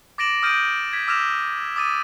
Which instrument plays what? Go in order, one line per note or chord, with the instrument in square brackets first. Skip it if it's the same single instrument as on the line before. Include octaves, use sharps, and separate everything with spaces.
[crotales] D6 A6 A#6 D7 E7 F#7
D#6 F6 G6 D7 D#7
G#6 B6
D6 E6 F6 A#6 E7 F7
D6 D#6 A6 D#7